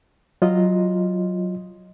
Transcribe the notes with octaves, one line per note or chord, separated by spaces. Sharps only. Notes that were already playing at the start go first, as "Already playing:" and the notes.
F#3 F4 D#5